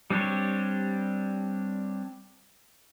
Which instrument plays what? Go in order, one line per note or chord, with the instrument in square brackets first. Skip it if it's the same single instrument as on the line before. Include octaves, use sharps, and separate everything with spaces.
[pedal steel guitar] G3 C4 D4 G4 C#5